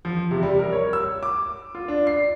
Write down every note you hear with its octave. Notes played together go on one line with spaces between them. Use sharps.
F3
C3
G3
A#4
C#5
E6
D6
F4
D4
C7